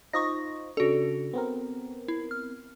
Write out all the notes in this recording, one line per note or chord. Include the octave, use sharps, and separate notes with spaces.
D#4 F4 C5 C#6 D#6 A#6
C#3 D4 F#4 A4
B3 C4 A#4
E4
F6